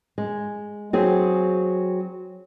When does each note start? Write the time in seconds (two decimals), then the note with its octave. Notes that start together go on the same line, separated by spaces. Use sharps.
0.18 G#3
0.93 F#3 C4 G#4